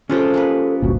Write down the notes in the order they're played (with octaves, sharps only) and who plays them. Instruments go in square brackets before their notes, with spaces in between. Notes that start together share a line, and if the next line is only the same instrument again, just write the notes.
[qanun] C3 F3 G#3 [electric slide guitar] C#4 F4 G4 [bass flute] A4
[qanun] G#3 A#3 B4
[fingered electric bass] G1 D2 A#2 [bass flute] F#4